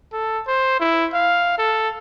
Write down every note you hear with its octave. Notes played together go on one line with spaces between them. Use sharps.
A4
C5
E4
F5
A4